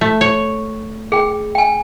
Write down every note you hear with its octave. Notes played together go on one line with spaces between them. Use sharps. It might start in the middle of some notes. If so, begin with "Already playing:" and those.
A3
C#5
G#4 G5
G5 G#5